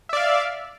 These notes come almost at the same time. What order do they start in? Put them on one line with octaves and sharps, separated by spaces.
E5 D5 F5